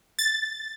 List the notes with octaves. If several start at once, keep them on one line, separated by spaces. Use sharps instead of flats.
A6